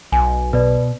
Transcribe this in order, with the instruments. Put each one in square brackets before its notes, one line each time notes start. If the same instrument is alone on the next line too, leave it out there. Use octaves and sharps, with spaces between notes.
[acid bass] B1 [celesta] G#5
[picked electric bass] B2 [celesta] B4 D5